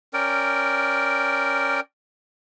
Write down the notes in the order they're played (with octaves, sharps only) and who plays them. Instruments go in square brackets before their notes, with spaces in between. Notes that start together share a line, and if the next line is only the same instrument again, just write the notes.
[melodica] C#4 A#4 D5 G5